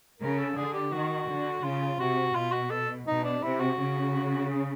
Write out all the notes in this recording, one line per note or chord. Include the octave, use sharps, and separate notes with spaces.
C#3 A#4
A4
D3 G#4
G4
D#3 F#4
D3
C#3 F4
C3 F#4
B2 F4
F#4
A4
B2 D#4
D4
C3 E4
F#4
C#3
G#4